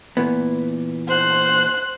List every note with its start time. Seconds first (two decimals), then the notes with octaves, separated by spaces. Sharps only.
0.17 A#2 E3 B3
1.08 C5 F#6